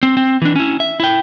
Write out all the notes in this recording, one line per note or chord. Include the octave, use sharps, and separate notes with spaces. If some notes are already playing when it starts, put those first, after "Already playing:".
C4
C4
E3 D4
C#4 E4
E5
E4 G5